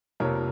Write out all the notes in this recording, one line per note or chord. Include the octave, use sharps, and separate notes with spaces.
F1 F2 C3 F3 A#3 A#4 C#5